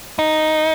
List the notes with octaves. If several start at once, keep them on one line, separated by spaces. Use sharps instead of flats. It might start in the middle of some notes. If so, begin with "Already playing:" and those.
D#4